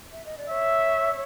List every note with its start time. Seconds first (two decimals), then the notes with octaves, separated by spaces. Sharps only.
0.12 E5
0.25 D#5
0.38 D5
0.49 C#5 E5